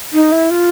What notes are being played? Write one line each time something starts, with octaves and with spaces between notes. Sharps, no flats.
D#4
E4
F4